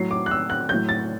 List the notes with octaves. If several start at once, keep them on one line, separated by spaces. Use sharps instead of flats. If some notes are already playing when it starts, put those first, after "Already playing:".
Already playing: A2 F#3 C7
D6
F#6
E6
F#6
A2 F#3 G6
A6